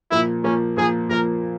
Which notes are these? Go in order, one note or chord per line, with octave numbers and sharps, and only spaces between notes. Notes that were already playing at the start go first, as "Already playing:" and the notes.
A#2 F3 A#3 E4
A#2 F3 A#3 C#4
A#2 F3 A#3 G#4
A#2 F3 A#3 A#4